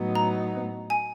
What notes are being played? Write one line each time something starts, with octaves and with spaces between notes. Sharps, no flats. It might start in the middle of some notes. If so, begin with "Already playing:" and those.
Already playing: A2 F#3 B3 D#4
A#5
G#5